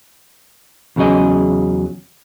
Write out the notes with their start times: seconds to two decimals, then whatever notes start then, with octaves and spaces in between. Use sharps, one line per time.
0.96 E2 C#3 F#3 G#4 D#5